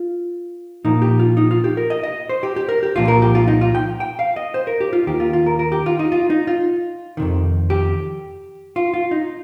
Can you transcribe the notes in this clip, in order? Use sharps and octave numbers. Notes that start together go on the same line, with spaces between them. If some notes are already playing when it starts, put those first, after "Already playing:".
Already playing: F4
A#2 F3 A#3 D#4
G4
F4
D#4
F4
G4
A#4
D#5
D#5
C5
G4
G4
A#4
G4
C2 A#2 F3 F4
A#4
G4
F4
D#4
F4
G5
G5
F5
D#5
C5
A#4
G4
F4
D#2 D#3 A#3 G4
F4
F4
A#4
A#4
G4
F4
D#4
F4
D#4
F4
F2 C3 D#3
G4
F4
F4
D#4